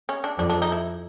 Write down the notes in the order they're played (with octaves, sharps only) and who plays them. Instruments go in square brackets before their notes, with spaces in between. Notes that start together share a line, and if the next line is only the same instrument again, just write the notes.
[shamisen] C#4
D4
[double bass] F2 [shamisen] D4
[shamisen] D4
D#4
E4